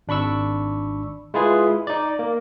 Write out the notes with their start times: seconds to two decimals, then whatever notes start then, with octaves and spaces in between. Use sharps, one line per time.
0.08 G#1 D4 B5 C#6 E6
1.34 G#3 E4 F4 G#4 B4
1.87 D#4 D5
2.19 A#3